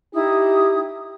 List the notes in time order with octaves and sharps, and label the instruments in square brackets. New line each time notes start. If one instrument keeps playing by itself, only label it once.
[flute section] D#4 E4 D#6 [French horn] G4